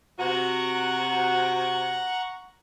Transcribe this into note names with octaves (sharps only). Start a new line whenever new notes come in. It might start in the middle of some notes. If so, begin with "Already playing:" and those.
C3 F#4 F#5 A#5 C#6